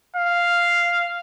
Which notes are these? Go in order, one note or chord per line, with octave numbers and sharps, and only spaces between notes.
F5